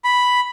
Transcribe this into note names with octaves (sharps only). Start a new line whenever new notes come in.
B5